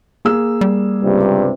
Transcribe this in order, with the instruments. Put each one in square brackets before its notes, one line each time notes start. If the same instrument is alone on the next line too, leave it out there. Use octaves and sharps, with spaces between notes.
[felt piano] A#3 G#4 E6
[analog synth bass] G3
[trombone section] C#2 G2 C3